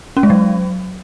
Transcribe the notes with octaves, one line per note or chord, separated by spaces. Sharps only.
C#4
G#3
F#3